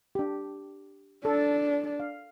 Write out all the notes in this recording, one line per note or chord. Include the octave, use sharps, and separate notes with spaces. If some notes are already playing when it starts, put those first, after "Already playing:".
D4 G4
D4 A4
F5